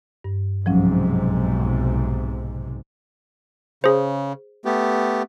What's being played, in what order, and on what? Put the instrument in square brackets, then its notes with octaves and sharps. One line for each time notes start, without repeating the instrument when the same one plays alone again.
[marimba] G2
[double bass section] B1 G#2 C3 [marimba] F3 F#3 C#4
[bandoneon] C#3 [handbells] G#4 C5
[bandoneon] A3 B3 G4